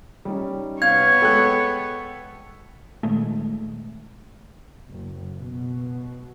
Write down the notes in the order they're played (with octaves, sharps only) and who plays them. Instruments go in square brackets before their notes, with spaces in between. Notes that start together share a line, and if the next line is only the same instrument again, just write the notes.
[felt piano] G3 C#4 D#4
[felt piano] C3 [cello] B3 C#5 [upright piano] F5 [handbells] G#6
[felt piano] G#3 G5 [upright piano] A4 F#6
[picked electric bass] A#2 D#3 G#3 A3
[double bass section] F#1
B2